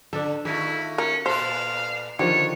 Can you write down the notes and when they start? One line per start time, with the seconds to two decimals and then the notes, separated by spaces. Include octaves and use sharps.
0.13 D3 D4 A4
0.45 D#3 A3 E4 F4 G#4
0.98 C#4 A#4
1.26 A#2 A4 B4 C5 F5
2.19 D3 D#3 F3 B3 F4 G4 C#5